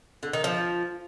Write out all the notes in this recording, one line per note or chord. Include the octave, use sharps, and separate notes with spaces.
D3
D#3
F3